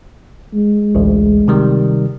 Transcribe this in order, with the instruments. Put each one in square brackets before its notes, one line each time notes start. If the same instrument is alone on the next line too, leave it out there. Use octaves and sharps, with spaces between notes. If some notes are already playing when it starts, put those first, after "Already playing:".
[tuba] G#3
[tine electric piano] A1 D2
C3 D#3 G3